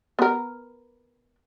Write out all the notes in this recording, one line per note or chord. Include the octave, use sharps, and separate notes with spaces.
B3 A#4